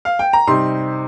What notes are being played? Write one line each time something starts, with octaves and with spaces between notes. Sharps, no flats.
F5
G5
A#5
C3 G3 C4 D#4 C6